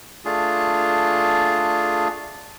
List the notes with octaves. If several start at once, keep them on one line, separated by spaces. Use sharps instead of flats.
A3 D4 F4 G#4